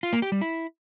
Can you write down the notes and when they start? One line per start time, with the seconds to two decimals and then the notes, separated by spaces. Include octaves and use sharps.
0.03 F4
0.13 A#3
0.22 G4
0.32 G3
0.41 E4